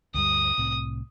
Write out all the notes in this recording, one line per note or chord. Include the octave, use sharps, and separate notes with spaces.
D2 G2 G3 D#6
C2 A2 C4